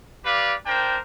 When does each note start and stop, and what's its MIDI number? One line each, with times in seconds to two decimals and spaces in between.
0.25 0.55 67
0.25 0.55 71
0.25 0.55 74
0.25 0.55 77
0.66 0.98 62
0.66 0.98 70
0.66 0.98 72
0.66 0.98 79